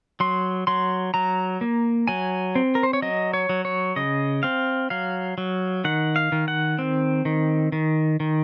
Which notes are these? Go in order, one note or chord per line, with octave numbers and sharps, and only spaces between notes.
F#3 C6
F#3 C6
F#3 A#5
A#3
F#3 G#5
C4
A#4
C5
C#5
F#3 D#5
C#5
F#3
C#5
C#3 D#5
C4 F5
F#3 F5
F#3
D#3 F#5
F5
D#3
F#5
C4
D#3
D#3
D#3